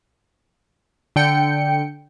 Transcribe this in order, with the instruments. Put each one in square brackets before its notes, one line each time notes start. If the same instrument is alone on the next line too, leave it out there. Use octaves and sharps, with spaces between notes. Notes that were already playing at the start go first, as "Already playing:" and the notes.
[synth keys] D3 G5 C#7